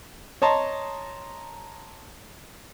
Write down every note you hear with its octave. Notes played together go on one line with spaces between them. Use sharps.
C#5 D#5 A5 A#5 C6